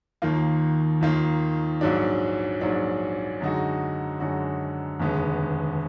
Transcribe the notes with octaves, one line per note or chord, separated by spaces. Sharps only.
D#2 D#3 A#3 F4
D#2 D#3 A#3 F4
A#1 G#2 F#3 D4
A#1 G#2 F#3 D4
F#2 D3 G#3 D#4 F#4
F#2 D3 G#3 D#4 F#4
F1 D#2 D3 G#3 B3